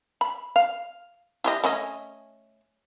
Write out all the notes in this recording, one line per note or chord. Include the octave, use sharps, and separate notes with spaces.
B5
F5
E4 G4 D#5
A3 C#4 D#5